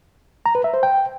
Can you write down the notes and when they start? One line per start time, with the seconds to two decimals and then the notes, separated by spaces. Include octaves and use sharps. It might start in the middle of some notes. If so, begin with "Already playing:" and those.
0.46 A#5
0.55 B4
0.64 E5
0.74 C5
0.83 G5